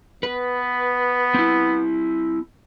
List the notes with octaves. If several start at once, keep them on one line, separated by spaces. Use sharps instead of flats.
B3 B4
C4 E4